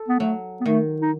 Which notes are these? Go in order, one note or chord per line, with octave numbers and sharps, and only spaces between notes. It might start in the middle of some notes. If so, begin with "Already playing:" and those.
Already playing: A4
B3
F#3 A3
B3
D#3 A3
D#4